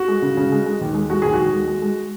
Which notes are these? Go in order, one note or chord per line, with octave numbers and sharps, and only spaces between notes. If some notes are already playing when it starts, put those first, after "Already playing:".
Already playing: F#4
G#3
C#3
C#3
G#3
G#3
D#2
G#3
G#3 F#4
D#2 G#4
D#2 F#4
G#3
G#3
G#3